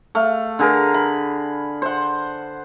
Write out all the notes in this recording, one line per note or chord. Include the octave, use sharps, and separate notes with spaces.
A3 F5
D3 G#4 A#4
B5
C5 F#5